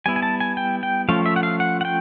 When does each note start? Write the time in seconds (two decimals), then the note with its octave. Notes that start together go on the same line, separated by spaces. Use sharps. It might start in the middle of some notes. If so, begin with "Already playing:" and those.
0.06 G3 B3 E4 G#5
0.16 G#5
0.23 A5
0.40 G#5
0.57 G5
0.83 G5
1.09 F3 A3 C#4 F4 F5
1.26 E5
1.36 F#5
1.43 F5
1.60 F#5
1.81 F#5
1.85 G5